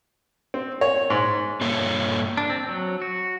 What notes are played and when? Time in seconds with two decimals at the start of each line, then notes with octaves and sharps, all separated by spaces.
0.54 C4
0.81 C#5
1.10 G#2
1.61 G2 A#3 A4 C#5
2.37 D4
2.50 C4
2.68 F#3
3.02 F#4